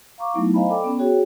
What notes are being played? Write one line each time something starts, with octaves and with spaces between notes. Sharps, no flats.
F5 A#5 C#6 D6
F#3 A3 B3 D#4 E4
C5 D#5 F5 G#5 A#5 B5
A4 D5 G5 B5 D6
B3 C#4
F#4 G#4 C#5 G5